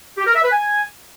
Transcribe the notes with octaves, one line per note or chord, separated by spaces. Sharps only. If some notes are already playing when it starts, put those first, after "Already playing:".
G4
A#4
E5
B4
G#5